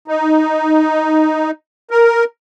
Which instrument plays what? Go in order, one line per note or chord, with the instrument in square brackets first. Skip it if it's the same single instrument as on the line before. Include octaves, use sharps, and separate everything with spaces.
[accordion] D#4
A#4